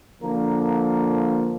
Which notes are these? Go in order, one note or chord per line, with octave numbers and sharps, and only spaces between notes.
D3 F3 A#3 A#4